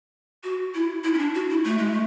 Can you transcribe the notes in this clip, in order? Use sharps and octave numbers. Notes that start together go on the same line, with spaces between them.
F#4
E4
E4
C#4
D4
F#4
E4
A3
G#3
A3